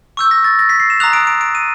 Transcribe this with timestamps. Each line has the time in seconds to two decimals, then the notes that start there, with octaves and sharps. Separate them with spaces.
0.17 C#6 E6 G6
0.31 A#6
0.44 A6
0.59 A#6
0.69 B6
0.80 C7
0.90 E7
1.00 A#5 D#6 F#6 F7
1.13 D7
1.27 D7
1.41 D7
1.55 D#7